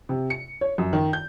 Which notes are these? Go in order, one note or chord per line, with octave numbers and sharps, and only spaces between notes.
C3
C#7
C#5
F#2
D#3
G6